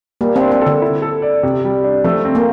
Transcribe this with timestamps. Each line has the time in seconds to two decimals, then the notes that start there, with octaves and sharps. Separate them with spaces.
0.21 G3 A#3
0.36 C4
0.41 D4
0.52 C4
0.62 D3 A4
0.82 E4
1.02 A4
1.22 D5
1.43 C3
1.64 G3
1.84 D4
2.04 F3 A3
2.25 C4
2.35 A#3